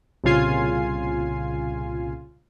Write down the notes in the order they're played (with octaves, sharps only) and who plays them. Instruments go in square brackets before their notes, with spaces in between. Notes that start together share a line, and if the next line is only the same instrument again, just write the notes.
[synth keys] C2 A#2 C#3 F4 G#5 C7